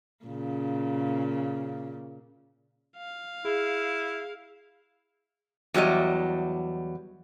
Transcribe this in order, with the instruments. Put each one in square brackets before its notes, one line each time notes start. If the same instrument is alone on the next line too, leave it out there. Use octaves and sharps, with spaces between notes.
[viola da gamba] A#2 C#3
[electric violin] F5
[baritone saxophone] E4 [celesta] G#4
[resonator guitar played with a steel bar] E2 F#3 G3 D#5